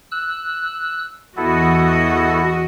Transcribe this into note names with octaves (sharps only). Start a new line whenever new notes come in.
E6 F#6
E2 B3 E4 F#4 A4 D#5